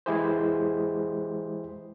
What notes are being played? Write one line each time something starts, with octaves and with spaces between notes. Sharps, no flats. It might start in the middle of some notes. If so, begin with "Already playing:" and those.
E3 G#3 E4 G4 G#4 C5